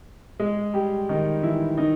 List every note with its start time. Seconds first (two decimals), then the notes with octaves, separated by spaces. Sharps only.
0.40 G#3 G#4
0.74 G3 G4
1.09 D#3 D#4
1.43 E3 E4
1.78 D#3 D#4